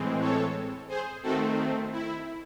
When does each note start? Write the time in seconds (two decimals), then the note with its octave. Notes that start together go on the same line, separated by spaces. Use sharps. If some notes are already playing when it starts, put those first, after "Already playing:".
Already playing: A2 E3 G#3 C4
0.21 A4 C#5
0.89 G#4 C5
1.23 D#3 A3 C4 F#4 A4
1.92 E4